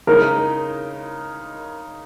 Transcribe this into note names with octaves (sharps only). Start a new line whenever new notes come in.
C#3 G#3 D#4 A#4